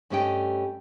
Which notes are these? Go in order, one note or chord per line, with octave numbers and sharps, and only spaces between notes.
G2 A3 C#4 G4 D#5 G5